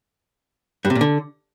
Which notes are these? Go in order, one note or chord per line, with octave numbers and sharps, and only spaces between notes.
G2
C3
A#2
D3